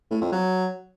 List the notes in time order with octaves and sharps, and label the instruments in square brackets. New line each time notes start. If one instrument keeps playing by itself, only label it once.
[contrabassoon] A2
F2
F#3